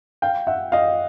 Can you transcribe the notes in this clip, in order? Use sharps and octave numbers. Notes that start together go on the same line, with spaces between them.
F5 G5
E5 F#5
D#5 F5